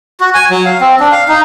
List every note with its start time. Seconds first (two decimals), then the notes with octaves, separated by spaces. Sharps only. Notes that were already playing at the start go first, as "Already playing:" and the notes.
0.20 F#4
0.34 G#5
0.50 F#3
0.66 F5
0.80 C4
1.00 D4
1.12 F5
1.28 D#4